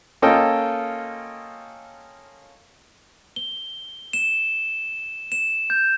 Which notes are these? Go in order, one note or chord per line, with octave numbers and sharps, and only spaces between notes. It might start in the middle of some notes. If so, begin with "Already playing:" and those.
A#3 C#4 F4 A4 D#5 G5
G7
E7
E7
G6